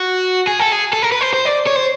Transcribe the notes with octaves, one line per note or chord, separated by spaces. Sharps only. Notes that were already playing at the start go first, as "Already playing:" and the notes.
Already playing: F#4
G#4
A4
G#4
A4
A#4
B4
C5
C5
D5
C#5
C5